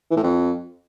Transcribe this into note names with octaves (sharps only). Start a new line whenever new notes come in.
E3
A2
F2